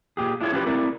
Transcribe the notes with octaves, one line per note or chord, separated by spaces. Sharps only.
A#2 G4 G#4
D4 E4 F4 G#4 C#5
C#4 D4 F4 G4 G#4 B4
A3 C4 E4 A#4 D5